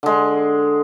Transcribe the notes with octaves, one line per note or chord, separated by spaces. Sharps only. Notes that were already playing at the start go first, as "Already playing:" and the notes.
D3 G#3